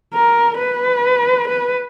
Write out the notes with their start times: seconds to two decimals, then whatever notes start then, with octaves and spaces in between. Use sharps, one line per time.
0.14 A#4
0.58 B4
1.48 B4